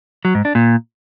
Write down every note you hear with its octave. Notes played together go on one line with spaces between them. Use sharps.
F#3
G#2
D4
A#2